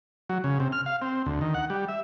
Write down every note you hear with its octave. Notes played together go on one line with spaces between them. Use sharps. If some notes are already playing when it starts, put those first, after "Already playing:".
F#3
C#3
C3
F6
F5
C4
D2
D#3
F#5
G3
E5